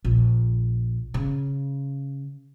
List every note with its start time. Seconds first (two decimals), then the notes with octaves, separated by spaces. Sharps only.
0.05 A#1
1.14 C#3